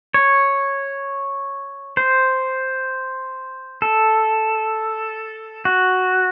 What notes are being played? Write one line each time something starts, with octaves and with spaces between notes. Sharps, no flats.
C#5
C5
A4
F#4